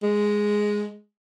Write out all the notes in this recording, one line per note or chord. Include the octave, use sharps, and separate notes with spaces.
G#3